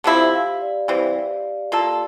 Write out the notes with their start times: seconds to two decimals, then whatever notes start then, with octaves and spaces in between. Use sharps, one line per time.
0.04 D3 F3 C4 E4 G4
0.33 F5
0.61 D5
0.88 E3 G3 C4
1.72 A#3 F4 A4